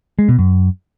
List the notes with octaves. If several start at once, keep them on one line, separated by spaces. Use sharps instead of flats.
G#3
B2
F#2